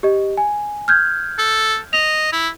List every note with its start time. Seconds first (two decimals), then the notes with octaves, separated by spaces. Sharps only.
0.03 G4 D#5
0.37 G#5
0.88 F6 G6 G#6
1.38 A4
1.93 D#5 F7
2.32 E4